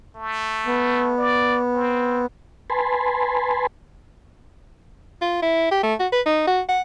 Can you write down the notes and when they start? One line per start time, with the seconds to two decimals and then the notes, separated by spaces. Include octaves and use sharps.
0.16 A3
0.66 B3
1.18 D5
1.75 C4
2.70 B4 G#5 A5 B5 C6
5.22 F4
5.42 E4
5.71 G4
5.83 A3
6.00 F#4
6.12 B4
6.26 D#4
6.47 F#4
6.69 F#5